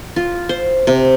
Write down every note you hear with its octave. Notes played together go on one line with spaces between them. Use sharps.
F4
C5
C3